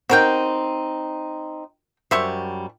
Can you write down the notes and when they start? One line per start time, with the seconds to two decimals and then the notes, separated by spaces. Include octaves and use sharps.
0.09 C4 D#4 F#4 A#4 G5
2.11 F#2 G3 C5 E5 C#6